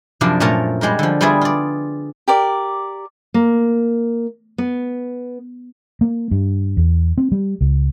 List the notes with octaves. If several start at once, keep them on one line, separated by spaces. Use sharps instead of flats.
F#2 C3 F3 A#3 D4
A#2 A3 C#4 A#4 A5 A#5
G3 G#3 G4 A#4
D3 F3
G3 B3 F4 G#4 D5 E5
F4 D5
G4 A#4 D5
A#3
B3
A#3
G2
E2
C4
G3
C#2